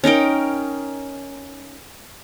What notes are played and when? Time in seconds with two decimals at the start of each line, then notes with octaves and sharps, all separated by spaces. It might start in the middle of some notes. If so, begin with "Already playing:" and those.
0.04 C#4 D#4 A#4 G5